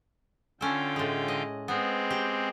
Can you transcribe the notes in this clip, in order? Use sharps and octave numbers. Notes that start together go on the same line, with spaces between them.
D3 C#4 F4 A4 G5
A2 G#3
D#5
G#3 B3 C4
G4